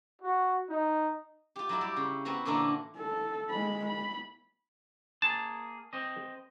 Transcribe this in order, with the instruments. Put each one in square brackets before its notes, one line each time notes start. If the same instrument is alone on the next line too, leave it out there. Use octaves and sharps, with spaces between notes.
[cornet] F#4
D#4
[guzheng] F4 G4
F#3 E4 D5
G3 E4 G4
C#3
B3 C4 F#4 B4 A#5
A#2 D3 E3 A#3 D4 A#4
[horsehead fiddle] A4
G#3 B5
B5
[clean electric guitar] A#3 G#4 [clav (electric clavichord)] A5
[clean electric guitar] C4 D#5